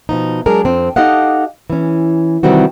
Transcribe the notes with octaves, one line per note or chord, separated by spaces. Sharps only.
B2 F3 D#4
F#3 G#3 D4 G#4 A#4
F2 C4
D#4 G4 A4 D#5 F5 F#5
E3 C#4
C3 D#3 E3 G3 C4 F#4